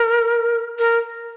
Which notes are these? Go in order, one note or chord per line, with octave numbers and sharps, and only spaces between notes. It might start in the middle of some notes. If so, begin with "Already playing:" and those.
Already playing: A#4
A#4